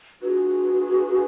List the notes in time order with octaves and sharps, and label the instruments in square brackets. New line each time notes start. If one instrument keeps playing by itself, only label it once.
[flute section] D4 F4 G#4 B4 [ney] F#4